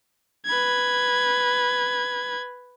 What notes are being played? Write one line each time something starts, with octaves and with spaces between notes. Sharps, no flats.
B4 G#6